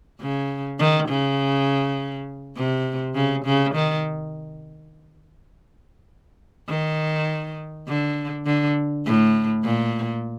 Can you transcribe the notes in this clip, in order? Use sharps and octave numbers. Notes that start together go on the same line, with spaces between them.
C#3
D#3
C#3
C3
C#3
C#3
D#3
D#3
D3
D3
A2
A#2